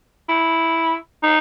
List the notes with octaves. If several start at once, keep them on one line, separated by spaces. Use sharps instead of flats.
E4
D#4